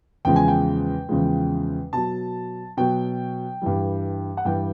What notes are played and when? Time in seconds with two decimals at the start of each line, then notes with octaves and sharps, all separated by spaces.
0.25 E2 C#3 F3 G#3 G5
0.36 G#5
0.48 G5
1.09 E2 C#3 F3 G#3
1.93 B2 F#3 A5
2.77 B2 F#3 G5
3.61 G2 E3 G3
4.37 F#5
4.45 G2 E3 G3 G5